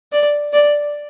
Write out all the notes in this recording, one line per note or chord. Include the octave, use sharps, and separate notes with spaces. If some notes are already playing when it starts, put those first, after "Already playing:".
D5
D5